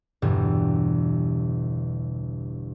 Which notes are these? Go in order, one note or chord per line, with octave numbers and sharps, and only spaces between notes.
G1 E2 G2 B2 E3 G3